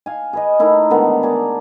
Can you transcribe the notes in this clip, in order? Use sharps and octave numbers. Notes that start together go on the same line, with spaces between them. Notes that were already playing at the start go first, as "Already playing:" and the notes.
F5 G#5
G#4 B4 D#5
A3 D#4 E4 A#4
D3 D#3 G#3 B3
G#4 A#4 D5 A5